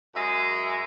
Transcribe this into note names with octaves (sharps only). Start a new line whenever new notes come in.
F#2 G#3 G#4 E5